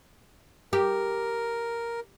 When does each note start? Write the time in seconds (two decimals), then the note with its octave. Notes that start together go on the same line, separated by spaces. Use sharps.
0.73 G4 A#4